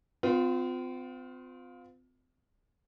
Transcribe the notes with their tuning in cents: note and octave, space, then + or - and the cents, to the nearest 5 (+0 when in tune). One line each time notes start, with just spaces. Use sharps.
C4 -40 F4 +20